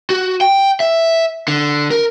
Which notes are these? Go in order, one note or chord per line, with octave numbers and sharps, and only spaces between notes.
F#4
G5
E5
D3
A#4